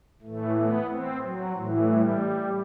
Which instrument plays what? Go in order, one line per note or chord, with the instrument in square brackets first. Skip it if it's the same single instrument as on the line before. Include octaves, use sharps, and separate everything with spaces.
[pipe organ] A2 E3 A3
B3
C4
F#3
A2 E3
G3